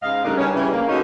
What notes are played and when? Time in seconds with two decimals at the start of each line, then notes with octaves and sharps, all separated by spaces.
0.02 G#2 C#3 D#5 F5
0.24 C#3 G3 A3 D4 D#4 A#4
0.37 G2 C#4
0.54 C#3 E3 G3
0.72 A#3
0.88 D3 B3 C#4 D#4 F#4 A4